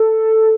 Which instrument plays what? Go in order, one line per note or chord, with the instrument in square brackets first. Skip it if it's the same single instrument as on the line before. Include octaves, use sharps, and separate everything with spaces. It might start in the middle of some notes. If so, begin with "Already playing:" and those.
Already playing: [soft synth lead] A4